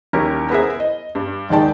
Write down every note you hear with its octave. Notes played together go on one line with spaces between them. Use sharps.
D#2 G3 C#4 E4 G4 A#4
B3 E4 G#4 A#4 C5 E5
D#5
G2
D#1 G#2 D#3 D5 G5 A5